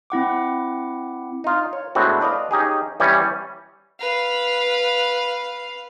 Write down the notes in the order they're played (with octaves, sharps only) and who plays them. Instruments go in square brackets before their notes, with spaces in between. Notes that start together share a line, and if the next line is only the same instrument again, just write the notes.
[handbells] C4 E4 F#5 D6
[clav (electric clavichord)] D#4 F4
C#5
A2 G#3 B3 C4 D4 F#4
B4 D5 D#5 F5
C#4 D#4 G4 G#4
E3 G3 C#4
[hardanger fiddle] B4 F5